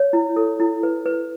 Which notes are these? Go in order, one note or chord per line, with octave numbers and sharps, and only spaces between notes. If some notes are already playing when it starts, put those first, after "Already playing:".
Already playing: C#5
E4
A4
E4
B4
B4